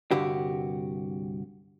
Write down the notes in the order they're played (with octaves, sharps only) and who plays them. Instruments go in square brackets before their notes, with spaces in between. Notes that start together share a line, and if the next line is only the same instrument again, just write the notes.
[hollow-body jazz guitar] C2 G2 D3 F#4 G4